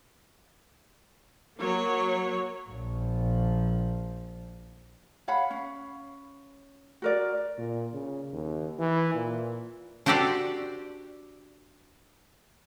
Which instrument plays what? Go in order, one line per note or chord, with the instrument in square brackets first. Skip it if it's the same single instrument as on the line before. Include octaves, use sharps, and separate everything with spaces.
[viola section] F#3 A#3 C#5
[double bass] A#1 F3
[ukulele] C#5 F5 F#5 B5
C#4
F#4 A#4 D5
[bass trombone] A#2
C#3
D#2
E3
A#2
[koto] D4 F#4 G4 A4 C5 D5